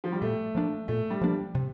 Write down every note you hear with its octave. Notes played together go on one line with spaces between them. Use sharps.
F3
G3
A#2 A3
F3 A#3 D4
A#2 A3
G3
F3 A#3 D4
C3